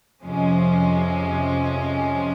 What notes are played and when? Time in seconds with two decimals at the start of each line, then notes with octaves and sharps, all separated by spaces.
0.23 F2 C3 F3 G#3 C#4